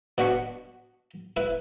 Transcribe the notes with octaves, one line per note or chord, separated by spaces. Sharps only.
B2 D4 F#4 B5 C#6
E4 B4